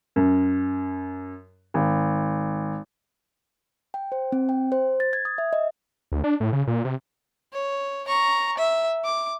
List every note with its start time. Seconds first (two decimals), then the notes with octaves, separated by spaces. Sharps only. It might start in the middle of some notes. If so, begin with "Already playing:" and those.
0.16 F#2
1.74 G#1
3.94 G5
4.12 C5
4.32 C4
4.49 G5
4.72 C5
5.00 A6
5.13 G#6
5.25 D#6
5.38 E5
5.53 D#5
6.12 D2
6.24 D4
6.40 A2
6.53 C#3
6.67 A#2
6.85 C3
7.53 C#5
8.07 A#5 C#6
8.58 E5
9.04 D6